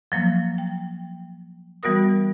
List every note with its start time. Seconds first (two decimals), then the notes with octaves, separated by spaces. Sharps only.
0.12 F3 F#3 A#3
0.58 G5
1.83 E3 G3 B3 F#4 A#4 D#6